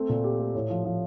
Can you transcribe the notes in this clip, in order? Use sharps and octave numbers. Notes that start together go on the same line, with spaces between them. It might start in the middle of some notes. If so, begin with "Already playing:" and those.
Already playing: A3 C4
A#2
G4
A3
A2
F3
F3